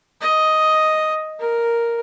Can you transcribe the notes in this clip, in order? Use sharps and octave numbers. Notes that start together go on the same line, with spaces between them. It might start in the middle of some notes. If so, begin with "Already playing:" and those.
D#5
A#4